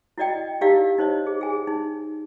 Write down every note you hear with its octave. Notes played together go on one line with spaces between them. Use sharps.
E4 F#4 D5 D#5 G5
D#4 E4 G4 D5 F5 E6
D#4 C5 C#5 D#5
G#4
G#4 G#5
D#4